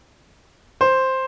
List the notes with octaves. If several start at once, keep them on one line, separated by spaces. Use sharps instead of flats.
C5